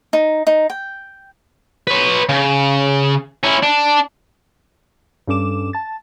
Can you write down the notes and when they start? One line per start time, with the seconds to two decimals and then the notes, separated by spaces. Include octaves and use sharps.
0.13 D#4
0.47 D#4
0.70 G5
1.87 B4 C#5
2.29 C#3
3.44 C#4 E4
3.63 D4
5.27 G2 G3 C#4 A4 D6 E7
5.73 A5 A6